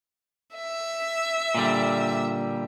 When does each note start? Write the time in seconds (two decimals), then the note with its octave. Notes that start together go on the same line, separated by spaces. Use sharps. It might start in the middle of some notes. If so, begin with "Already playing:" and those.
0.55 E5
1.55 A#2 D3 G3